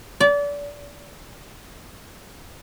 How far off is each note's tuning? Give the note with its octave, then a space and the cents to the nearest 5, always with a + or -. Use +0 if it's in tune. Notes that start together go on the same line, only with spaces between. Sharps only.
D5 -30